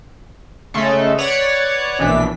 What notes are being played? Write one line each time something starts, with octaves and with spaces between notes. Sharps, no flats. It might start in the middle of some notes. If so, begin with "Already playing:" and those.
C#3 G#3 A3 A4
B4 C#5 D5 F#5
A#1 B2 E3 D4 B6